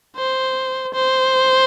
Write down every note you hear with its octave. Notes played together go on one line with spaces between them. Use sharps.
C5
C5